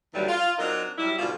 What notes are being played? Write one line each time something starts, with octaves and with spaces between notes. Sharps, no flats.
D#2 A2 D3 E3 F#3 G3
F4
F#3 C4 D4 D#4 F4 A#4
F#3 G3 E4
G#2 B2 D3 G3 F4